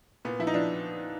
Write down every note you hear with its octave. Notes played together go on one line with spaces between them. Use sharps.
A#2 B3
F3 E4
D#4
F3 D4